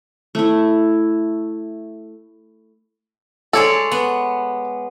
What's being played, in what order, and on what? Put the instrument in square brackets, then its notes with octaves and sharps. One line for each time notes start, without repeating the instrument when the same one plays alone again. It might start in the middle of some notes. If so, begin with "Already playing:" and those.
[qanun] A3 E4
[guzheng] G#3 C#5 D5 [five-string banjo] A4
[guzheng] B3